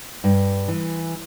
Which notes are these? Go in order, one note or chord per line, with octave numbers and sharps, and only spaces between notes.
G2
E3